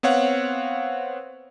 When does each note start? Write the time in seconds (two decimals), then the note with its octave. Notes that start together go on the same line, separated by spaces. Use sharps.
0.03 B3 C4 C#5 F5 F#5